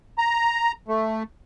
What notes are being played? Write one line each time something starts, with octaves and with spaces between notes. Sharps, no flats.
A#5
A3